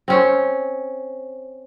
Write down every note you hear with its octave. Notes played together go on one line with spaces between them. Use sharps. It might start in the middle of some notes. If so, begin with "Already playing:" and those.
C4 C#4 C5